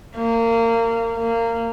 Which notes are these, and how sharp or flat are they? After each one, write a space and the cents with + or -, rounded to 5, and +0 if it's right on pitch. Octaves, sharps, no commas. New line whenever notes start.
A#3 -25
A#3 -20